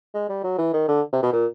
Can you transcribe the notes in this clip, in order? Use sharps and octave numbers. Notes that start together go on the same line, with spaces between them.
G#3
G3
F#3
E3
D#3
D3
C3
B2
A#2